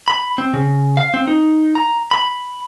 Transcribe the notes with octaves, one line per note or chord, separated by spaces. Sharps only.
B5
C4
C#3
F5
C4
D#4
A#5
B5